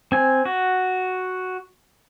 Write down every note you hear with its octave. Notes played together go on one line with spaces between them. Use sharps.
C4 G#5
F#4